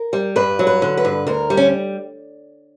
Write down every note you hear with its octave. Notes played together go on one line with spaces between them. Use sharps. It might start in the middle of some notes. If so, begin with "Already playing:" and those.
Already playing: A#4
G3
G2 B4
F#3
B4
D3
B4
G2
D2 A#4
G3
C#4